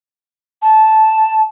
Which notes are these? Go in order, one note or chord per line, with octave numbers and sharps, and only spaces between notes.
A5